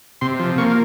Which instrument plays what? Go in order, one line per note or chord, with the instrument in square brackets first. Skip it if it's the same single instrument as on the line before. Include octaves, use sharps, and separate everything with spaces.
[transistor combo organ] C3 C6
F3
A#3 C#6